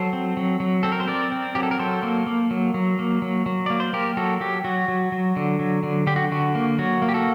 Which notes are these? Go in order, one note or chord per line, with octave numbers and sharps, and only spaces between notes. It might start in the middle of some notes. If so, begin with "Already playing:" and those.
Already playing: F#3 A4 C5
C4
F#3
F#3
C4 A4
A#4
C5
C4 A#4 D5
C4
F#3 G4
A4
A#4
F#3 A4 C5
A#3
A#3
F#3
F#3
A#3
F#3
F#3
A#3 D5
C5
A#3 G4 A#4
F#3 F#4 A4
F#3 G4
F#3 F#4
F#3
F#3
D3
F#3
D3
D3 G4
F#4
D3 F#4
A#3
F#3 F#4
A#3
G4
F#4 A4